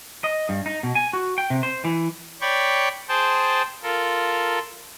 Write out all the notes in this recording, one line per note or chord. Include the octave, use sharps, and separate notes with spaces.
D#5
G2
D#4
B2
G#5
F#4
G5
C3
C5
E3
C#5 D5 G5 B5 C#6 G6
G#4 C5 G5 A5
F4 A4 A#4